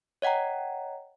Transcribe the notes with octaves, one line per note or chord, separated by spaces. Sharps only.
C#5 D#5 F#5 G5 A#5